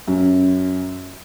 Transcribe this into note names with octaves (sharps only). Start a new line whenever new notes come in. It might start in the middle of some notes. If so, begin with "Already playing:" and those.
F#2